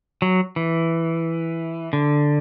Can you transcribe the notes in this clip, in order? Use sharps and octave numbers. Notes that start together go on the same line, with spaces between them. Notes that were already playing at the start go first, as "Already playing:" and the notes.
F#3
E3
D3